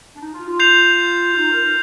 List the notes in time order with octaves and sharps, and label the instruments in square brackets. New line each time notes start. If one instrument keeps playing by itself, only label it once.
[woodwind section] D4
D#4
F4
F4
[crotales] G6 C7 F7
[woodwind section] F4
D#4
A#4
A#4